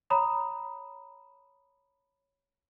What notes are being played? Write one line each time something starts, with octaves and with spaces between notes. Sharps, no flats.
C#5 A#5 B5 D#6